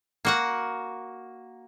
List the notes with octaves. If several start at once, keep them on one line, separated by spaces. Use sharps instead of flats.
A#3 F#4 F#5